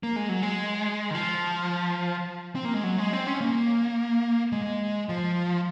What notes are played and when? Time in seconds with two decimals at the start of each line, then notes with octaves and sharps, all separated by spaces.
0.03 A#3
0.16 G#3
0.29 F#3
0.43 G#3
1.11 D#3
1.15 F3
2.56 C4
2.65 A#3
2.74 G#3
2.84 F#3
2.98 G#3
3.13 C4
3.27 C#4
3.41 A#3
4.52 G#3
5.09 F3